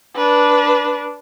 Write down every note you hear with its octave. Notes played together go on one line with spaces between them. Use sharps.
D4 B4